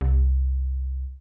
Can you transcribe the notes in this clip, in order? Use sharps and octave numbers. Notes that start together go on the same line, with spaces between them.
C2